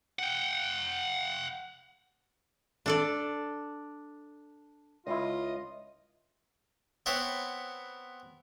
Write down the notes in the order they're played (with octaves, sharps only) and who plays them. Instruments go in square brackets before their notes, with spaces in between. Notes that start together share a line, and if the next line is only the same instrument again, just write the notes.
[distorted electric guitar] F#5 G5
[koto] D4 A4 D5
[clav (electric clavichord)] C#2 E4 [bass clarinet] F4 [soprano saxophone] D#5
[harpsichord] B3 C4 E4 C5 C#5 F#5